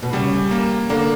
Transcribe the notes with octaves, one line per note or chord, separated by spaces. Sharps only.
B2
C#3 G3
A#3
D3 A#3